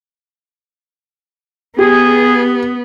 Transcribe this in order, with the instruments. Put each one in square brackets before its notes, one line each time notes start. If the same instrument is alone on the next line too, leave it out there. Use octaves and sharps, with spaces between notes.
[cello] B3 [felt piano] G4 [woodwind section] G#4